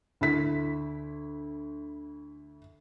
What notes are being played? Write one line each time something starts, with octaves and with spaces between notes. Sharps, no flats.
D2 E4 B6